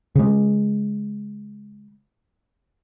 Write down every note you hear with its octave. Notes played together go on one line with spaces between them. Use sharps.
C#3 G#3